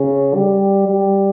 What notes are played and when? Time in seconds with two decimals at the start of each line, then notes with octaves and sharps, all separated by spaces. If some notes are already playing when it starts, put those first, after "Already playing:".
Already playing: C#3
0.35 G3
0.87 G3